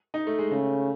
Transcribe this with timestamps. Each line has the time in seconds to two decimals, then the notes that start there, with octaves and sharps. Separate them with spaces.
0.14 D#4
0.27 A3
0.39 G#3
0.51 C#3 A3